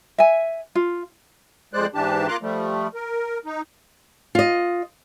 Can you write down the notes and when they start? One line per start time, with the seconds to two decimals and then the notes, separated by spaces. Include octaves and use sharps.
0.18 E5 G#5
0.75 F4
1.74 F2 G#3 C5 D5 F#6
1.94 G#2 E3 D4 G4 A5
2.28 A#3 F4 A#5 C6 D6 F#6
2.42 F3 G3 A3
2.94 A#4
3.45 D#4
4.35 F4 D#5